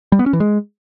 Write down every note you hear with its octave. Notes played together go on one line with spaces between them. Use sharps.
G3
B3
C#4
E3
G#3